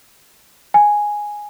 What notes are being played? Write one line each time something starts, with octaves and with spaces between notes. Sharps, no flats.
G#5